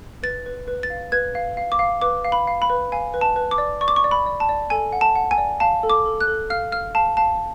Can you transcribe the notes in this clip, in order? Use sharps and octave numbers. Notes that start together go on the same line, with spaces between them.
B4 A6
B4
B4
A6
F5
B4 G#6
F5
F5
D6
F5
B4 D6
F5
B5
F5
B5
B4
F5 G#5
B4
A5
B4
D6
D5
D5 C#6
D6
C#6
D5
B5
D5
A5
D5
A4 G#5
F#5
A5
F#5
G#5
D5
F5 A5
A4
D6
A4
F#6
A4
F5 F6
F5 F6
F5 A5
F5 A5